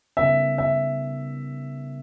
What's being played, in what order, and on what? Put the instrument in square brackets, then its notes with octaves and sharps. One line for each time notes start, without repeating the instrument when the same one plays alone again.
[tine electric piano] C#3 G3 B3 D#4 A#4 [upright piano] E5
[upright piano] E5